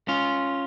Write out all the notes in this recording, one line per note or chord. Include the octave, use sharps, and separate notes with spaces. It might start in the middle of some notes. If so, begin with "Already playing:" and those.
C#4 F4